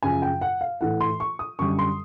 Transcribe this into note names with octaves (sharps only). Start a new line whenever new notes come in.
F#2 C#3 F3 G#5
G5
F#5
F5
A2 E3 A3 F#5
C6
C#6
D#6
F#2 D3 G3 C#6
C6